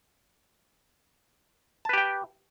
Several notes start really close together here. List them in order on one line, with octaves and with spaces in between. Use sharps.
A5 B4 G4 G5